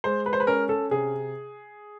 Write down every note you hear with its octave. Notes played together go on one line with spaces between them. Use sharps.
G#3 C5
B4
C5
B4
C#4 A#4
A4
C3 G#4